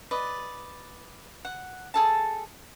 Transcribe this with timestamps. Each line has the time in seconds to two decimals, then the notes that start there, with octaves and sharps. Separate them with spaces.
0.11 B4 D5 D#5
1.45 F#5
1.94 G#4 A4 A5